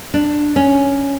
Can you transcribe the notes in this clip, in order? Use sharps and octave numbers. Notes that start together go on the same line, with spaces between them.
D4
C#4